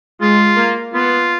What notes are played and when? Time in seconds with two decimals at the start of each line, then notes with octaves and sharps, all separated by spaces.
0.21 G#3 F4
0.57 A#3
0.94 B3 F4